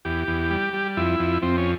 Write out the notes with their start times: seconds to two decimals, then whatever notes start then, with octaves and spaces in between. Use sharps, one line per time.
0.05 E2 G4
0.28 E2
0.50 G3
0.73 G3
0.97 F2 E4
1.20 F2
1.42 F2 C4
1.58 C#4